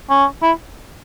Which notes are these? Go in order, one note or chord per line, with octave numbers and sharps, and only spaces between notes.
C#4
E4